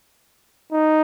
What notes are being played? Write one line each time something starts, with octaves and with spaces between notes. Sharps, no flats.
D#4